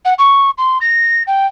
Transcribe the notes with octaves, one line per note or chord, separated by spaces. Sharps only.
F#5
C#6
C6
A#6
G5